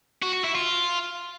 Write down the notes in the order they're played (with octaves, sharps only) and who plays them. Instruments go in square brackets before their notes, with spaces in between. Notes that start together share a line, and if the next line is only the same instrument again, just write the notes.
[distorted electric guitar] F#4
F#4
E4
F4